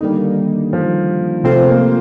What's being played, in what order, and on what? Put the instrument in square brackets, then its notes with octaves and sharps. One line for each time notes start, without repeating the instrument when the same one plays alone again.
[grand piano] D3 [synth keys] D#3 G3 A#3 D#4
[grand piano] F3
[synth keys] C3 F3 C4 F4 C5 [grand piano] A3
[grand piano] A3
A#3